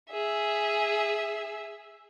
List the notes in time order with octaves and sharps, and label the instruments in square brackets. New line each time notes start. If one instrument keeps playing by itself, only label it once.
[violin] G#4 E5